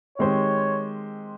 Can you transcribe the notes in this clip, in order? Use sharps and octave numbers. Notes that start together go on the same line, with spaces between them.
D#3 G#3 C4 G4 C5 C#5